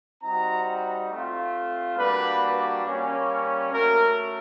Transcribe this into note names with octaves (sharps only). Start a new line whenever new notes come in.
G3 C4 D#4 F#4 A#5
A3 C4 F4
G3 A#3 D4 F#4 B4
G3 A#3 C#4
A3 C#4 F#4 A#4